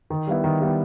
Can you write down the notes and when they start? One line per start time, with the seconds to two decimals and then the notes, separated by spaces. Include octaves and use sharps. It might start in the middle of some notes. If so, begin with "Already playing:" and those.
0.10 D#3
0.27 G3 B3 E4
0.44 D#3
0.61 G3 B3 E4